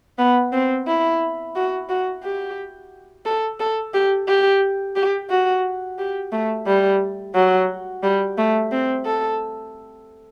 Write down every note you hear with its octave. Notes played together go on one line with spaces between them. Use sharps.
B3
C4
E4
F#4
F#4
G4
A4
A4
G4
G4
G4
F#4
G4
A3
G3
F#3
G3
A3
C4
A4